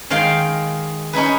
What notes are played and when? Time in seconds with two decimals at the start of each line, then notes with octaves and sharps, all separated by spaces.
0.10 D#3 G#3 F5 G5 C6
1.13 C#4 D#4 E4 B4